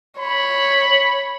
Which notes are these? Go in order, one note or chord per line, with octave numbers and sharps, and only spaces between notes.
C#5 B5